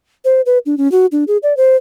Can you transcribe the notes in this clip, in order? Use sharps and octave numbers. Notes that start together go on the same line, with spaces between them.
C5
B4
D4
C#4
F#4
D4
G#4
D5
C5